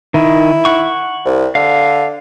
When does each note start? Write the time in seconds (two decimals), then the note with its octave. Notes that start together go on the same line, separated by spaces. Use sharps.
0.14 D#3 E4
0.65 F#5 C#6
1.25 C2
1.55 D3 F5